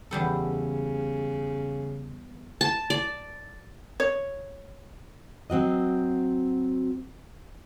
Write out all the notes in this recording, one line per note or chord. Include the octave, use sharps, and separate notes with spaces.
E2 C#3 G3 A4
A5
D5
C#5
F#3 C4 F#4 D#5